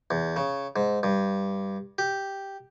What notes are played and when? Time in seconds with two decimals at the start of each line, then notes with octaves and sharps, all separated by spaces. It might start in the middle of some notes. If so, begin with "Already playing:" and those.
0.11 E2
0.36 C#3
0.76 G#2
1.03 G2
1.98 G4